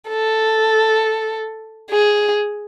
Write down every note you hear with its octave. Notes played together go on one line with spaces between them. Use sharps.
A4
G#4